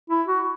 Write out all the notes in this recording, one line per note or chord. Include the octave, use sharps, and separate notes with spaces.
E4
F#4